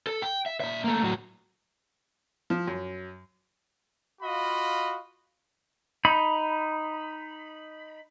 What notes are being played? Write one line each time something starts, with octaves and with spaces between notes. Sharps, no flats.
A4
G5
E5
A#2 E5
A3 A#3
A2 F#3
F3
F#2
F4 F#4 D#5 F5 B5
D#4 B5